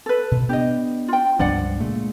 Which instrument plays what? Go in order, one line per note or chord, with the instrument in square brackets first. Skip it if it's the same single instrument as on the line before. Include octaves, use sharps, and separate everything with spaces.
[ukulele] A4 B4
[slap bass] B2
[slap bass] B3 D4 [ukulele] G4 D#5
[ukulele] F4 G5
[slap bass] C#2 G2 F3 [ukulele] D4 D5 F#5
[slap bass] A#2 G#3 A3